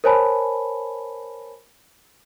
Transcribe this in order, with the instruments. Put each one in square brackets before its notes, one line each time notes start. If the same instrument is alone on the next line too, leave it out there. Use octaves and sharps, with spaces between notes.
[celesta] A#4 C5 C#5 G#5 A5 B5